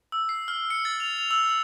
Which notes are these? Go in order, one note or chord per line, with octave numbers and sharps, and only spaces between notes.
E6
C7
F6
C#7
A6
F7
F7
E6
E6